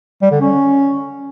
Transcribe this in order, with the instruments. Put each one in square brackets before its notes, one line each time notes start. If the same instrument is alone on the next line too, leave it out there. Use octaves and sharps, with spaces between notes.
[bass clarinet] G3
D3
C#4